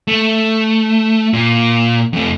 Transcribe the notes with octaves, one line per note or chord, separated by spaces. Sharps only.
A3
A#2
F2 A3